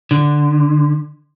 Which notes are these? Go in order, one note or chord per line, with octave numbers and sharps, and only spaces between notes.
D3